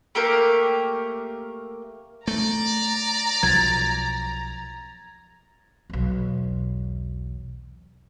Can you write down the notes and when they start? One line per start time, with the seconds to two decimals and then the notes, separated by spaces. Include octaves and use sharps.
0.15 A3 A#3 G4 A#4
2.28 A3 D5 A#5
3.43 B1 F3 G#6 A6
5.90 B1 E2